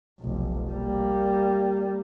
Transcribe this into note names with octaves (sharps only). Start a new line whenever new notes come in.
F1 B1
G3 A#3